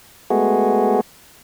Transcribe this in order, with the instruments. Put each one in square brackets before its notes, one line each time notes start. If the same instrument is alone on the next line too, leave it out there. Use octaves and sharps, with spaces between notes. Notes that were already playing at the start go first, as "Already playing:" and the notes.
[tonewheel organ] G#3 A3 B3 F#4 G#4